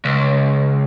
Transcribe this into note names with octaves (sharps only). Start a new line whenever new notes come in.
C#2